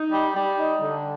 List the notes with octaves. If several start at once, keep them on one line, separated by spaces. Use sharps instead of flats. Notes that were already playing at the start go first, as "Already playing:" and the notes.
Already playing: D#4
G3
G3
D#4
D3